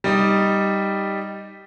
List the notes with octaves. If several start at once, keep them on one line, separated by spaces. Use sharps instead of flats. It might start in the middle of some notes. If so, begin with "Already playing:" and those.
G3 D#4 D#5